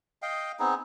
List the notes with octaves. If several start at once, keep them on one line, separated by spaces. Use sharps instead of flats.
D#5 F5 G5
B3 C4 D#4 G#4